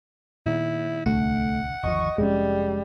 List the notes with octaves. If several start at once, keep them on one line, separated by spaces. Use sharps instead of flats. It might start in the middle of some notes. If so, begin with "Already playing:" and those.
A#2 D#3 E4
D1 C2 D3 A3 F#5
G1 D#2 F3 D#5 C#6
F1 F2 G3 G#3 C#4